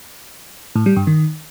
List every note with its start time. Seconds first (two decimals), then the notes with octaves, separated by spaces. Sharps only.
0.76 A2
0.86 G3
0.97 G2
1.07 D#3